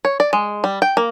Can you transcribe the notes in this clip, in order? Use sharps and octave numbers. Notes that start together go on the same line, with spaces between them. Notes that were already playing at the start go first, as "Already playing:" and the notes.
C#5
D5
G#3
G3
G5
A#3